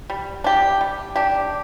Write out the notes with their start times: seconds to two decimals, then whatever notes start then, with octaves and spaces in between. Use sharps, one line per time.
0.10 G3
0.44 D4 G4
0.81 G3
1.16 D4 G4